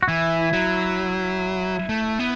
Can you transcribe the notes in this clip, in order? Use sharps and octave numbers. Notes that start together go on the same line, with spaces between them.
F#4
E3 E4
F#3
A3
B3